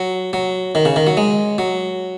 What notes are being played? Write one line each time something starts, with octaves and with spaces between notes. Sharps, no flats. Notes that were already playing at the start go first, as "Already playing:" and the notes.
Already playing: F#3
F#3
D#3
C#3
D#3
F#3
G#3
F#3